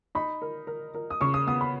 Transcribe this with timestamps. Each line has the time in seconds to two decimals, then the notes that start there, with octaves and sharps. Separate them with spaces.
0.15 D#4 B5
0.42 A#4
0.67 A#4
0.95 A#4
1.10 D#6
1.21 C#3 C#6
1.34 D#6
1.47 B3 D#6
1.61 B5